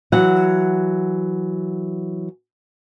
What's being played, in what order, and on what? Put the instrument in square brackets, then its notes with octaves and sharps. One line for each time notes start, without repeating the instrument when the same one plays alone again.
[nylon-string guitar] E3 F#3 F#5